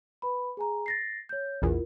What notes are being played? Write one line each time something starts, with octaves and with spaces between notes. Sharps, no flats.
B4 B5
G#4 G#5 A#5
A6 A#6 C7
C#5 G6
A#1 E2 E4 F4 A#4